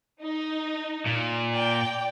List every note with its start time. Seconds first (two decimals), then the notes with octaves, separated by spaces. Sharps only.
0.23 D#4
1.07 A#2
1.53 D5 G5